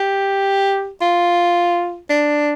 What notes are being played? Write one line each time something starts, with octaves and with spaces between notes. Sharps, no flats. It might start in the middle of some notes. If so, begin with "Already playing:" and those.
Already playing: G4
F4
D4